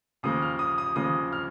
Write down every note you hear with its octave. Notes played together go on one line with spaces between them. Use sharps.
D#2 C#3 F3 A#3 D#6
F6
D#6
D#6
D#2 C#3 F3 A#3 D#6
F6